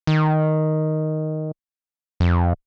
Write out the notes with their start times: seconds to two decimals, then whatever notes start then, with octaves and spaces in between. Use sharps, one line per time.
0.07 D#3
2.20 F2